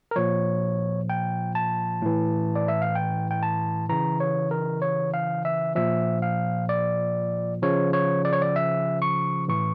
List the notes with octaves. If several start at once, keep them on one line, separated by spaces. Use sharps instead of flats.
A#4
A#2 F3 C#5
G5
A5
A2 E3
D5
E5
F5
G5
G5
A5
C#3 E3 A#5
C#5
A#4
C#5
F5
E5
A#2 F3 E5
F5
D5
C#3 F3 C#5
C#5
D5
C#5
D5
E5
C#6
A2 E3 C#6